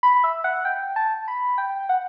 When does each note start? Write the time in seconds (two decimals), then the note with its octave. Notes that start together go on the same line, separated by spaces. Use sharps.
0.03 B5
0.24 E5
0.44 F#5
0.65 G5
0.96 A5
1.28 B5
1.58 G5
1.89 F#5